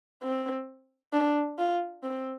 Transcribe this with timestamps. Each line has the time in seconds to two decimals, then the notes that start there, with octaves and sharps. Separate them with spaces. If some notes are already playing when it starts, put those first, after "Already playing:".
0.23 C4
1.13 D4
1.58 F4
2.03 C4